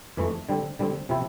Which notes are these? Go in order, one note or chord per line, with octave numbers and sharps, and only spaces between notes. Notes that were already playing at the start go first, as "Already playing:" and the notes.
F2 E3 A3
D3 G3 C4
D3 G3 C4
C3 F3 C4 E4